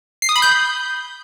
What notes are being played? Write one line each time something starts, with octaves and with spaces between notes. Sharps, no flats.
C7
D#6
B5
G6